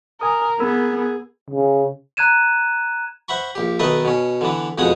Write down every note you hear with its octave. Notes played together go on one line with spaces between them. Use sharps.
A#4 G#5 D#6
B3 G#4 A#4 B5 E6
C#3
A#5 F#6 G#6 D#7 E7
C5 E5 F#5 B5 C#6
A#1 G4
B1 D#3 D#4 A4 B4 E5
B2 C#4
D3 E3 B3
F2 B2 G#3 F#5 G#5 D#6